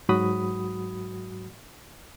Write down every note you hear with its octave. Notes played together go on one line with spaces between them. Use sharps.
G#2 F#3 F#4 B5 D#6